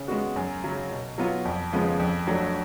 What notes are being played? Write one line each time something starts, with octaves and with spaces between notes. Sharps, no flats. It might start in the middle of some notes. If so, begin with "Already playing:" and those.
Already playing: C#3
G#3 B3 F#4
F#2
C#3 F#3 C#4
B2
F#3 B3 F4
F2
C#3 F3 G#3 B3
F2
D3 F#3 A3